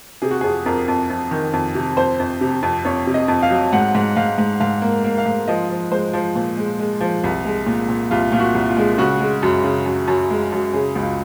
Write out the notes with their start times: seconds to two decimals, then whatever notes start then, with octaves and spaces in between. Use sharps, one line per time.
0.22 C3 G#4
0.31 F#4
0.41 F2 G#4
0.65 F2 A#4
0.88 F2
1.10 F2
1.31 D#3
1.53 F2
1.75 C3
1.97 F2 C5
2.20 F2
2.41 C3
2.63 F2
2.85 F2 C#5
3.07 C3
3.14 D#5
3.28 F2
3.43 F5
3.50 F#3
3.73 G#2 F#5
3.95 G#2
4.16 G#2 F5
4.38 G#2
4.60 G#2 F5
4.82 A#3
5.04 A#3
5.18 F5
5.26 G#2
5.48 F3 D#5
5.69 F3
5.91 G#3 C5
6.13 F3
6.36 A#2
6.57 G#3
6.80 G#3
7.00 F3
7.24 C2
7.45 G#3
7.66 A#2
7.89 A#2
8.11 C2 F4
8.32 A#2 F4
8.40 F#4
8.54 C2
8.69 F4
8.77 G#3
8.98 C#3 F#4
9.21 G#3
9.43 F#2
9.64 C#3
9.86 F#2
10.08 F#2
10.30 G#3
10.52 F#2
10.74 C#3 G#4
10.96 C#2
11.02 F4